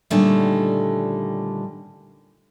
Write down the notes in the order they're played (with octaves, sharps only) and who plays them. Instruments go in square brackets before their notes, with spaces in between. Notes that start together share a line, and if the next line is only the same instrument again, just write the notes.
[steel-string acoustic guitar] A#2 D3 D#3 G3 A3 C#4